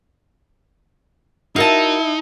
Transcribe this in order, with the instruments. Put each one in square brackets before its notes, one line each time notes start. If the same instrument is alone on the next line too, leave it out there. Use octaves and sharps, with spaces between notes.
[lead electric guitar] D#4 [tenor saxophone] E4 [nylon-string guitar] F#4 A#4 E5 [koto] F5 A5